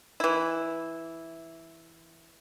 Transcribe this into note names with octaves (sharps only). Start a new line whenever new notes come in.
E3 E4